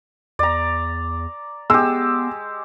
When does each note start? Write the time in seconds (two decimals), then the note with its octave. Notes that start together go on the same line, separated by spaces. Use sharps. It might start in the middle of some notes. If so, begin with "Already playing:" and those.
0.39 E2 D5 A#5
1.70 G#3 B3 G4 E6